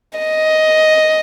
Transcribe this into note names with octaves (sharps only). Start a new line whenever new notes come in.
D#5